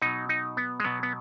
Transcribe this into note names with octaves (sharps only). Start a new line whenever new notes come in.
B2 F#3 D#4
D#4
B3
G#3
B2 F#3 B3
B3